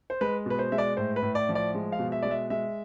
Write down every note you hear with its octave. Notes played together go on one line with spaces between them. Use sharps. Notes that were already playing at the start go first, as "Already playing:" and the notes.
C5
G#3 B4
B2 B4
C5
G#3 E5
D5
A2 C5
B4
A2
D5
F3
D5
G#3
F5
B2
E5
G#3 D5
E5
G#3 E5